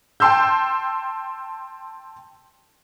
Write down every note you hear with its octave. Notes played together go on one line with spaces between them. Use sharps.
G5 A5 C6 E6 G6